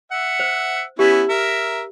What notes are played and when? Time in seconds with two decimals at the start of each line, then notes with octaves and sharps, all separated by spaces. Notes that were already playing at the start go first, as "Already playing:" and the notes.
0.12 E5 F#5
0.40 C5
0.99 B3 C#4 E4 G4
1.29 A#4 E5